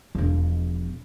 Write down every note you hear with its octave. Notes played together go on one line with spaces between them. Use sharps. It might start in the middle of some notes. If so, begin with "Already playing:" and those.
E1 F3